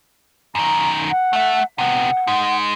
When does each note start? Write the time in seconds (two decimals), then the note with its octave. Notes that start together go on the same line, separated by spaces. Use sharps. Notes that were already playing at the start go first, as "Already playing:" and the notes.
0.55 F#2 D#3 A#5
1.10 F#5
1.33 A3 E5
1.78 C3 B3 F#5
2.27 G#3 D#4